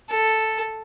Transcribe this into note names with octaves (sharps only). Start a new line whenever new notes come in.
A4